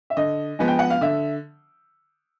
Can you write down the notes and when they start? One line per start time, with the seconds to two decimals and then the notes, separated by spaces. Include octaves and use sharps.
0.10 E5
0.17 D3 D#5
0.59 F3 G#3 B3
0.68 G5
0.79 F#5
0.90 F5
1.01 D3 E5